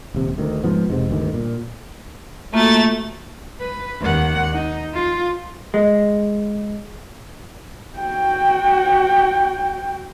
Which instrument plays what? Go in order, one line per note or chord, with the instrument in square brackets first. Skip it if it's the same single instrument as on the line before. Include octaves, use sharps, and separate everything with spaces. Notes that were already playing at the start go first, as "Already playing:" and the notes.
[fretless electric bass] D#1 C3
D2 D#3
G#2 F3 B3
E1 G#2 C3
D2 G2 D#3
A#2
[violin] A3 A6 [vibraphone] A#3 F4 F#4
[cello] B4
D#2 F#5
D#4
F4
[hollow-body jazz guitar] G#3
[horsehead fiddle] F#4 G5